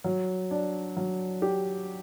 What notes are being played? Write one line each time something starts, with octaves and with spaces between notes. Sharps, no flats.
F#3
D4
F#3
G4